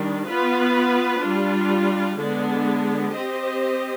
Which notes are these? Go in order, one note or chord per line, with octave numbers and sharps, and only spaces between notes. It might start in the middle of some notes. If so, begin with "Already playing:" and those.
Already playing: D#3 G3 D4
B3 F4 B4
G3 D4 F4
D3 G#3 B3 D4
C4 G4 C5 D#5